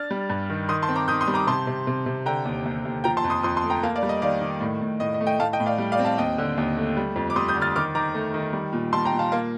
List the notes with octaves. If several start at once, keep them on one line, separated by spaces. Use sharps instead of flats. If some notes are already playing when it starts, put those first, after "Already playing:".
Already playing: D4 F6 A6
G3
G2
D#3
D#3 C6 D#6
A5 C6
C4
A#5 D6
D#3 D#6 G6
C6 D#6
G3
A#5 D6
C3 A5 C6
C3
C3
C3
D3 G5 A#5
D#2
D#2
D#2
F3 G5 A#5
A5 C6
F2
C6 D#6
F2 C6 D#6
A5 C6
A3
G5 A#5
A#3 F5 A5
D5 F5
G3
D#5
D#3 D5 F5
D#3
A2
A2
A2 D#5
D#5
A3
D#5 G5
A2 F5 A5
D#5 G5
A2
D5 F5
G3
D5 F5
C4
F5 A5
D#2 D#5 G5
D3
D#2
A3
G3
F2
D6
G3 C6 D#6
D#6 G6
D3
F6 A6
D#3 D6 F6
D#3 A#5 D6
A3
D#3
G3
A#2
G3 A5 C6
G5 A#5
A#2
F5 A5
A#3 F5 A5